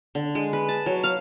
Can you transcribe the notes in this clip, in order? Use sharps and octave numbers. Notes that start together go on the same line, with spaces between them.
D3
G#3
B4
A5
F#3
F5